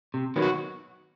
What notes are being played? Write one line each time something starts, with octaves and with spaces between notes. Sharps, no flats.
C3
D#3 F#3 B3
F#4